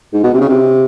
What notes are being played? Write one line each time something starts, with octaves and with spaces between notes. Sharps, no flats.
G#2
B2
C3
C#3
C3